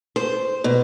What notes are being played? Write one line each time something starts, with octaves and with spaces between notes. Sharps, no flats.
C5
B2